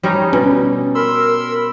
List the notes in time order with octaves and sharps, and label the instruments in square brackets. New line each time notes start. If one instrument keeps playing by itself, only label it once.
[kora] G3 C#4 D#4
[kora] B2 [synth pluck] C#4
[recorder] A#4 [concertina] B5 C6 E6